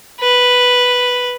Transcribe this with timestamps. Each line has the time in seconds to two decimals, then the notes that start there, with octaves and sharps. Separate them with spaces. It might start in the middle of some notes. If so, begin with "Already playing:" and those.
0.20 B4